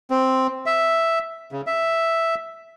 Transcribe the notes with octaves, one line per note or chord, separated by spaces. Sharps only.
C4
E5
C#3
E5